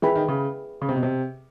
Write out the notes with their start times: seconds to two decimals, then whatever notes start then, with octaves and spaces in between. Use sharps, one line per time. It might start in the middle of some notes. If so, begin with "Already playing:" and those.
0.02 E3 G#4 B4 E5 G5 B5
0.16 D#3
0.28 C#3
0.82 C#3
0.89 C3
0.95 B2
1.03 C3